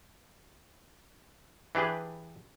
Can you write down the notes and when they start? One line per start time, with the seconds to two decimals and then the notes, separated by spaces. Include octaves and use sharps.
1.75 E3 D4 G4 G#4 B4